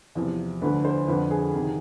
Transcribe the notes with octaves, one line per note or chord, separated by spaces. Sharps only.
E2 C3 F3
D2 D3 F3 B4
C5
F2 D3 F3 B4
G#4
C3 D#3